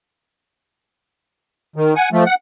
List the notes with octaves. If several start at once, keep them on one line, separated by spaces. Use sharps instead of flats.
D#3
F#5 G#5
F3 A3
F#5